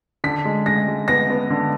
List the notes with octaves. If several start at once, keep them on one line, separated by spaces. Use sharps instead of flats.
D3 B6
G#3
G#3 A#6
G#3
B3 A#6
B3
D3